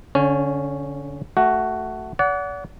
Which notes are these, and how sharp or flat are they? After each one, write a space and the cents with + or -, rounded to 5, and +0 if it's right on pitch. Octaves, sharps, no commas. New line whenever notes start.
D3 -25 C#4 +0 C#5 -25
A3 +0 F#4 +10
D5 -40 F#5 +0